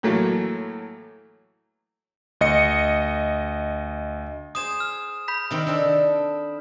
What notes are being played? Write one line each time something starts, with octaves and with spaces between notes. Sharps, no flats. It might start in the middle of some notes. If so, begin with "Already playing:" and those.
A2 E3 F#3 A3 A#3
D2 D#5 C#7
G#4 C5 D#6 E7
F6
B5 G6 B6
C3 D#3 C4
C4 D4 A4